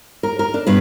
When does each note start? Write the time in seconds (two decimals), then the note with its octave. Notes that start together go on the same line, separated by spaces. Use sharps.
0.23 A#4
0.39 A#4
0.54 D4
0.67 G2 B2 B4